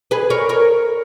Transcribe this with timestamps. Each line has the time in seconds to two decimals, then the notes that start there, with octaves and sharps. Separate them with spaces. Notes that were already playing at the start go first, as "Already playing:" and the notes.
0.11 G#4 B4
0.30 A#4 C#5
0.49 A#4 C#5